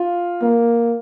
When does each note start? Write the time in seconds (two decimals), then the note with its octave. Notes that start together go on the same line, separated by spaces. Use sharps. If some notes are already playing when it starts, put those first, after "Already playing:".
Already playing: F4
0.42 A#3